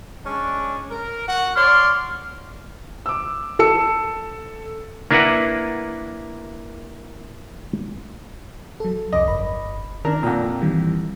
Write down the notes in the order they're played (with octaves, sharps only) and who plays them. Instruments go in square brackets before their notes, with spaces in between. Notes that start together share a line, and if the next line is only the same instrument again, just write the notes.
[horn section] G#3 C#4 D4
A#4
F#4 F#5
[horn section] C#5 D5 C6 [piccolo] F6
[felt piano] D6 E6
A4 E6 C#7
[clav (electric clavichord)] A#3 D4 E4 A#4 B4 F#5
[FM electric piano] F#3 A4
[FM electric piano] C2 F2 D6 [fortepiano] D#5
[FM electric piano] G1 B5
[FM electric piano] D#3 [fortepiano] D4 A#4
[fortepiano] F2 A#2 [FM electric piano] F#5 G5 A#5
[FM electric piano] D#3 E3 G3